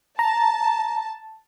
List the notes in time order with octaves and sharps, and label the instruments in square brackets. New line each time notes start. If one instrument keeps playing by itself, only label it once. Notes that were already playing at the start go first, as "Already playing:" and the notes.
[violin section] A5 [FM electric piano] A#5